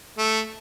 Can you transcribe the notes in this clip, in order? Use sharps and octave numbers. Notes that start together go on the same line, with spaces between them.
A3